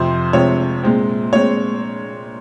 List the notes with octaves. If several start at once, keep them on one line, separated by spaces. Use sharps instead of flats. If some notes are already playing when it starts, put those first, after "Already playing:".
Already playing: F2 C3 F3 C5
C3 F3 G#3 C4 C#5
A#2 G#3 C4
A#2 G#3 C4 C#5